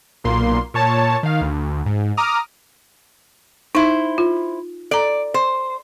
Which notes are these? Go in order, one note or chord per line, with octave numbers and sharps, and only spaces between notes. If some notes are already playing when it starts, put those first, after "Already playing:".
B1 A#2 A#3 C6
A#2 C#5 A5
D#3 F5
D2
G#2
A#5 D6 D#6 F6
D#4 E4 C5
F4
A4 D5 A#5
C5